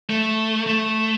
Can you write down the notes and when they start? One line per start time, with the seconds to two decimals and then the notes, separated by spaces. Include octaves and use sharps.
0.10 A3
0.66 A3